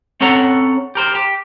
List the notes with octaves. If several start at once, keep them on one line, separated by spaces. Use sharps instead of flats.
C4 C#4 A4 F#5 A#5
G4 A#4 C5
G4